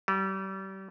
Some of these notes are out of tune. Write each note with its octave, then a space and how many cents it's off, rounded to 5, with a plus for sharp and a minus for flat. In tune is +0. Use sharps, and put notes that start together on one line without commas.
G3 -35